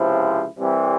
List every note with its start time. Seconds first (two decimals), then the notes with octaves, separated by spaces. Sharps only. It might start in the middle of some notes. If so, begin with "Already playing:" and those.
Already playing: C#2 C3 F3 C4 E4
0.59 C2 C3 E3 G3 C4